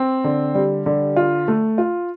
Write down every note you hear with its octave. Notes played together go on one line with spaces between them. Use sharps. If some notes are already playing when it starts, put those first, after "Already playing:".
Already playing: C4
D3
G3
D3
F4
A3
F4